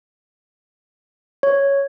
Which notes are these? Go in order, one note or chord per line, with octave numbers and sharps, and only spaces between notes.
C#5